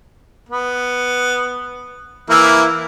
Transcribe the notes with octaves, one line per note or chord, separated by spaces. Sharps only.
B3
E3 A#3 E4